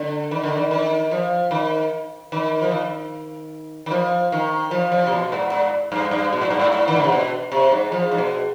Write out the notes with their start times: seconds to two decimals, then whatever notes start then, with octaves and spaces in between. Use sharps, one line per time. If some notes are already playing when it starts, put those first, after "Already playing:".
Already playing: D3
0.31 D#3
0.43 D3
0.56 D#3
0.71 D#3
1.11 F3
1.51 D#3
2.32 D#3
2.62 F3
2.71 D#3
3.86 D#3
3.91 F3
4.32 D#3
4.71 F3
4.92 F3
5.07 C3
5.12 B2
5.32 G#2
5.52 G#2
5.92 G2
6.11 G2
6.33 B2
6.41 G#2
6.50 G2
6.60 G#2
6.72 G#2
6.88 D#3
6.96 D3
7.04 C3
7.12 B2
7.52 C3
7.72 G#2
7.92 F3
8.11 G#2
8.18 B2